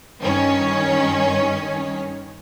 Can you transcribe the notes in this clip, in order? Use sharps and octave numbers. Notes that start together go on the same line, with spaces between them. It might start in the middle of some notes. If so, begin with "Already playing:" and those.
G2 D#3 C#4